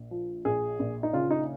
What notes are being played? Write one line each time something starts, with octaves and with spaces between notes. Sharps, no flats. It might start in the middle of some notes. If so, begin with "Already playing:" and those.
Already playing: A#1
F3
A#1 G#4
A#1
D#4
C#3 F4
D#4